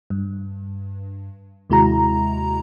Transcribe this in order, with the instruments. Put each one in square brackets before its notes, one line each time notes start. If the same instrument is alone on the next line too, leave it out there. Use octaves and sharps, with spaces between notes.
[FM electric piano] G2
D#2 C3 G#3 E4 F#4 A#5